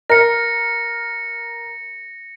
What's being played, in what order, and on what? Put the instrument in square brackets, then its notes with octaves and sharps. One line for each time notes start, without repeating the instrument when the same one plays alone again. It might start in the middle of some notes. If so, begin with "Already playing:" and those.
[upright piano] A#4 [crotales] A#6 C#7